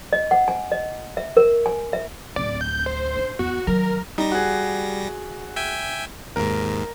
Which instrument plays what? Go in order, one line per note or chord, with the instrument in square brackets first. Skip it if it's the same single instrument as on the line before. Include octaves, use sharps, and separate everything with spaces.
[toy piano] D#5
F#5
G#5
D#5
E5
A#4
G#5
E5
[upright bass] D1 C4 [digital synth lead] D5
[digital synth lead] G6
C5
[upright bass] D4
[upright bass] E2 [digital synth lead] F#4
[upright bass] D#3 F#3 [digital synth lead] A#4
[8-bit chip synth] G3 A#6 [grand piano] D#4
[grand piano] F#4 G#4
[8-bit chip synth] E5 G5 G#5
[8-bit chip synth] D#2 G#2 [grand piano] A#4